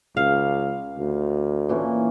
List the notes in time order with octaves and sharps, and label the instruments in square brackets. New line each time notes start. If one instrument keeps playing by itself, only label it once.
[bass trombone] C#2 [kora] F5
[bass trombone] D2
[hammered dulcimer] A#2 E3 C#4